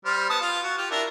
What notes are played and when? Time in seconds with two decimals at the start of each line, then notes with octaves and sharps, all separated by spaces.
0.06 G3 C5 F6
0.30 B3 A5 D#6
0.42 F4 F5
0.63 F#4
0.78 F4 G4
0.91 D4 E4 A#4